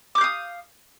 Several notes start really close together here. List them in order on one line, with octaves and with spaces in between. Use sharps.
D6 G6 F5 D#6